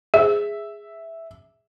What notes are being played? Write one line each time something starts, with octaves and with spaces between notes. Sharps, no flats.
G#4 E5